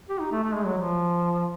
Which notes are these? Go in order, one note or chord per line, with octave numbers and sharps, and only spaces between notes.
G4
D#4
A3
A3
G#3
F#3
F3